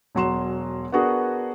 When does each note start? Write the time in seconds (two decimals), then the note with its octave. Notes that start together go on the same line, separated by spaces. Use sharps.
0.15 E1 F#3 C6 E7
0.92 B3 D4 F#4 G#4 A#4